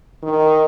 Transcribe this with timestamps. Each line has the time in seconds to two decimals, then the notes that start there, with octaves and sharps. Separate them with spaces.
0.23 D#3